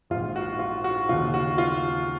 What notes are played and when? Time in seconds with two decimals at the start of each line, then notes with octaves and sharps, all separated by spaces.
0.10 A#1 G#2 D#3 F4
0.36 F#4
0.59 F4
0.84 F#4
1.09 D#2 C#3 F4
1.34 F#4
1.58 F4